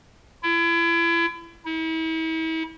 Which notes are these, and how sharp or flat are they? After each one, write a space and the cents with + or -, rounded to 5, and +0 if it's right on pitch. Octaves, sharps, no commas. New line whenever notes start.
E4 +35
E4 -40